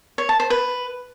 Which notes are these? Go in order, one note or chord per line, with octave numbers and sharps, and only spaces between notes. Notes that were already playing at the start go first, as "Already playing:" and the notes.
C#5
A5
C5
B4